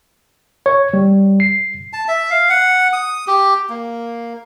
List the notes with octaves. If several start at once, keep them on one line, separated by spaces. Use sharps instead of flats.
C#5
G3
C7
A5
E5
F5
F#5
D#6
G4
A#3